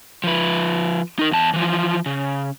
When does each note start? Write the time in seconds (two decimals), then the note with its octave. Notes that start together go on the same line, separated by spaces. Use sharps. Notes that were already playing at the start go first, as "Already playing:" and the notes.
0.24 F3 B4
1.19 D#4 A#4
1.31 E2 A5
1.53 E3 F3
2.06 C#3